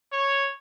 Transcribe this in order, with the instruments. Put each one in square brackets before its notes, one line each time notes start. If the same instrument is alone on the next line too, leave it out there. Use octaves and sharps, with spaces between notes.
[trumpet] C#5